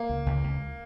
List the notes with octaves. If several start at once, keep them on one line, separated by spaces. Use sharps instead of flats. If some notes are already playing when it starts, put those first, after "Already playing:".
Already playing: A#3
C#2
C#2
C#2